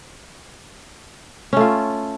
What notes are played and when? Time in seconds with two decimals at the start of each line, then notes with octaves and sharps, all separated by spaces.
1.53 C#4
1.57 A3
1.60 F4